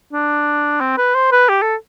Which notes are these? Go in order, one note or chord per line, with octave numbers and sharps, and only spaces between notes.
D4
C4
B4
C5
B4
G4
A4